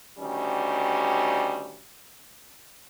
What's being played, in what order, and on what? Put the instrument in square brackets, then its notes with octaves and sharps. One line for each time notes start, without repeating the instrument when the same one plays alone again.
[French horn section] D2 D#3 G3 C#4